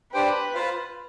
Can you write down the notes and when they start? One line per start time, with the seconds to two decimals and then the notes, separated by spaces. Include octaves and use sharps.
0.14 D4 G4 B4 C5 G5
0.54 F4 C5 F5